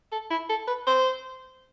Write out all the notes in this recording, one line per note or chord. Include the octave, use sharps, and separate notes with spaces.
A4
E4
A4
B4
C5